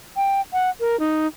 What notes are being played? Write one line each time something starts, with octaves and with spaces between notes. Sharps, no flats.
G5
F#5
A#4
D#4